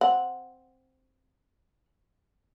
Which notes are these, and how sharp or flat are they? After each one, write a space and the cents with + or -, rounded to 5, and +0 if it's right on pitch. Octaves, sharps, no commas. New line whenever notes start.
C4 +0 F#5 -10